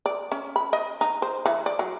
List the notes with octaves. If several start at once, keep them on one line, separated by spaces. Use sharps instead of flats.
D5
C#4
B5
D#5
D#4
C5
E3
D5
F#3